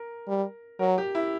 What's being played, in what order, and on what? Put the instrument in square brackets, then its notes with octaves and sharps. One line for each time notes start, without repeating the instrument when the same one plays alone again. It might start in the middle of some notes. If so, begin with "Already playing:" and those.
Already playing: [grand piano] A#4
[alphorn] G3
[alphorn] F#3 [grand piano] A#4
[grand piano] G4
E4